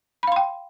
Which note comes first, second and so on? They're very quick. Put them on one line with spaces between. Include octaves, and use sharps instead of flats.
B5 F5 C6 G5